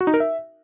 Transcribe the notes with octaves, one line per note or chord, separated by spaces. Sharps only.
F#4
D#4
A#4
E5